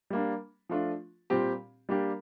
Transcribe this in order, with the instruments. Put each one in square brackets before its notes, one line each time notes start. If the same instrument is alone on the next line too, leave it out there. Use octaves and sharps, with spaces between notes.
[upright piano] G3 A#3 D4
F3 A3 D4 F4
A#2 G3 C4 G4
G3 A#3 D4 G4